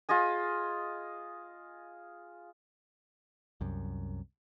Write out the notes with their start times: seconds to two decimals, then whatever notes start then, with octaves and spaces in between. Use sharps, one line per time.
0.09 F4 G#4 D#5 G#5
3.61 C2 F#2